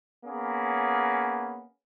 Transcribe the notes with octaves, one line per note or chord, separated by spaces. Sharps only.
A#3 B3 C#4 G#4